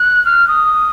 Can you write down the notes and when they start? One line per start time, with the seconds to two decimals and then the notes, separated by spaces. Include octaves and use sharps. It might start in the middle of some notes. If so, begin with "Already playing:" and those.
Already playing: F#6
0.25 F6
0.48 D#6